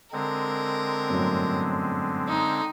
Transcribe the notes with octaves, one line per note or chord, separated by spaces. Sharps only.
D3 G#3 C4 A#4
G1 F#2 A2
D#4